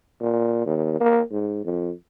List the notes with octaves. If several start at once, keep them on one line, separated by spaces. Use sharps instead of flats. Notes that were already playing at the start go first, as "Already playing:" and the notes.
A#2
D#2
A#3
G#2
F2